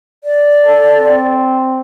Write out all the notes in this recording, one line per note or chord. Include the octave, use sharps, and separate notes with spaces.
D5
A4
C4